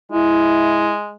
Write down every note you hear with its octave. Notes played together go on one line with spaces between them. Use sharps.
G#3 E4